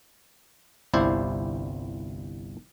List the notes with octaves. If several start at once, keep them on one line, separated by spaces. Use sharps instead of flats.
G1 C2 E4 C5 D5